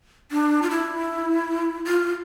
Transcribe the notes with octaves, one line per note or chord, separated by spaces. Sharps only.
D4
F4
E4
F4